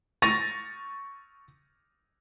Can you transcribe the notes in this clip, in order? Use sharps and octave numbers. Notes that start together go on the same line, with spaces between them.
C#6 A6 A#6 D#7 F7